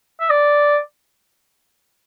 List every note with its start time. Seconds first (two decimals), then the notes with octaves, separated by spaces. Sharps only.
0.20 E5
0.30 D5